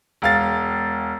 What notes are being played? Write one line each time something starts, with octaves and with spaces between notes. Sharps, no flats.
E1 F5 A6